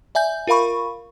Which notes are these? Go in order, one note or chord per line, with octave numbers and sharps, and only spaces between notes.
D5 E5 G#5 G6
F4 A#4 F5 B5 C#6